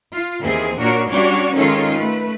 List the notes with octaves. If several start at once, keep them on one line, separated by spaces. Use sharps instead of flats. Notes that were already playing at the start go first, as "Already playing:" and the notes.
F4
D#2 E3 C4 G#4
A#2 D4 F#4 A#4 C#5
G3 C#4 D4 F#4 C#5 D5
D#3 G#3 C#4 F4 A4 C#5
A3 B4